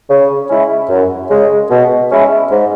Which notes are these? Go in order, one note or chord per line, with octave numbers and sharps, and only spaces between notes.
C#3
G#3 C#4 E4
F#2
C#3 G#3
B2
G#3 C#4 E4
G#2